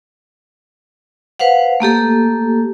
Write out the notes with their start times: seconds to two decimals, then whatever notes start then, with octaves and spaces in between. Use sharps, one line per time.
1.40 B4 C5 F5 F#5
1.80 A3 A#3 G4 A4